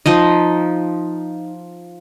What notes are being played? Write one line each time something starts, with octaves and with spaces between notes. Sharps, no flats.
F3 D#4 D#5